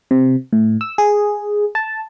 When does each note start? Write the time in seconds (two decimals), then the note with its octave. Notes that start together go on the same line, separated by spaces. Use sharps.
0.11 C3
0.53 A2
0.81 E6
0.98 G#4
1.75 A5